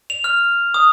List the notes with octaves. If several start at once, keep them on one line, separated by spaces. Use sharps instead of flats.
F7
F6
D#6